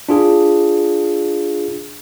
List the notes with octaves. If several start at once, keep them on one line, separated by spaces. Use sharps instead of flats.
D4 F4 G#4